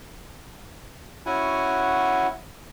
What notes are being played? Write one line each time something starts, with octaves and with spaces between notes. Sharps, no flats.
C#4 E4 F#4 F#5 G#5